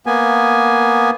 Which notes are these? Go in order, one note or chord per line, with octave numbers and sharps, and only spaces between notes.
A#3 B3 G#5